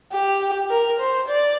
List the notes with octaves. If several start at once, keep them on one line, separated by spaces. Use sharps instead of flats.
G4
A#4
C5
D5